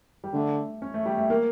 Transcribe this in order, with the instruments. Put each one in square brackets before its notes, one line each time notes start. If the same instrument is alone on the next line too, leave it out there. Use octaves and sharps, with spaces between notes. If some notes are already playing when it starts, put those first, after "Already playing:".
[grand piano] G3
[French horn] D3 [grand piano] A3
[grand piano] C#4
A3
G3
A3
A#3